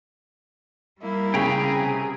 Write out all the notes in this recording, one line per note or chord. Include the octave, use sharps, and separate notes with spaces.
G3 A#3 E4
C#3 G#4 G5 A#5 B5
C3